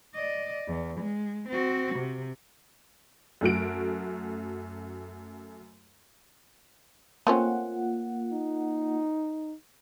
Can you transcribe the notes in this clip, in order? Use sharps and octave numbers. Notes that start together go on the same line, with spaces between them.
D5 D#5
E2
G#3
C4 F#4
C3
F#2 A3 F#4 D7
A3 A#3 C4 C#4 F4 F#5
D#4